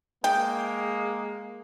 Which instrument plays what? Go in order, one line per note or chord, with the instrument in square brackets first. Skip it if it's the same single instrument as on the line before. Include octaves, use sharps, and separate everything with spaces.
[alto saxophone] G#3 [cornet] A#3 [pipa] G5